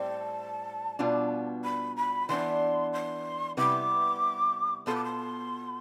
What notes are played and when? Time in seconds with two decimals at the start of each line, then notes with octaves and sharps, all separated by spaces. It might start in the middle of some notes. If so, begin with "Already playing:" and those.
Already playing: A2 G3 C4 A5
0.99 B2 G3 B3 D4 F4
1.64 B5
1.96 B5
2.28 E3 B3 D4 C6
2.93 C6
3.57 C3 G3 B3 E4 B4 D6
4.86 B2 B3 F4 A4 C6
4.95 D6
5.04 C6